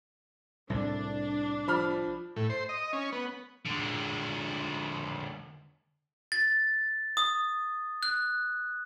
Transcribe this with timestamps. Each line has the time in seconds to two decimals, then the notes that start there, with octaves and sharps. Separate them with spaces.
0.70 C2 A2 D4
1.68 F3 B5 F6
2.36 A2
2.50 C5
2.69 D#5
2.93 C#4
3.12 B3
3.65 D3 G#3
6.32 A6
7.17 D#6
8.03 F#6